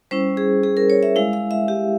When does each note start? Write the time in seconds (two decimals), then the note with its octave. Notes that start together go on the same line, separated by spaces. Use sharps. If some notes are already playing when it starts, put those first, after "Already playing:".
0.11 G3 C#4 E4 C5
0.37 G#4
0.63 G#4
0.77 A#4
0.90 C#5
1.03 E5
1.16 G#3 E4 F5
1.33 F5
1.51 E5
1.68 G4